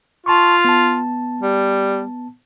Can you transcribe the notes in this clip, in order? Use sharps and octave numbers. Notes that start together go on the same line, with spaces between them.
F4 A5 C6 C#6
B3 A5
G3